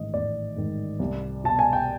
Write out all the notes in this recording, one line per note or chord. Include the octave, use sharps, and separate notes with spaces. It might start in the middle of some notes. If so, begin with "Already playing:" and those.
Already playing: A1 G#2 D#3 D#5
A1 D5
G#2 D#3
C2
B2 A5
G#5
G5